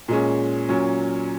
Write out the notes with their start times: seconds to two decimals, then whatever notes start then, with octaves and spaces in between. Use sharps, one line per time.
0.08 A#2 G#3 C#4
0.69 A#2 F#3 C#4